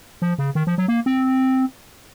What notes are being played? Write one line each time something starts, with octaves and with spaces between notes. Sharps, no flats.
F3
C#3
D#3
F3
F#3
A#3
C4